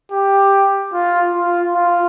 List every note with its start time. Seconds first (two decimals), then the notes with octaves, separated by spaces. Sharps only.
0.12 G4
0.93 F4
1.34 F4
1.75 F4